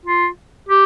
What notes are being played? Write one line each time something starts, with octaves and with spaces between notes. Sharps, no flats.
F4
G4